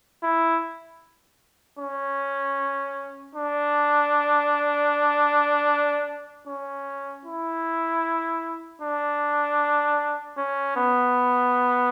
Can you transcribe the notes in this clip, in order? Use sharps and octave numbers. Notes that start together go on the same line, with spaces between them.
E4
C#4
D4
C#4
E4
D4
C#4
B3